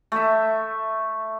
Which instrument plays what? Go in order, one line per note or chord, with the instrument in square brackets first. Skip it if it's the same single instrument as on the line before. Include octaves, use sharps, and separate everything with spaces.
[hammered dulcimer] A3 E5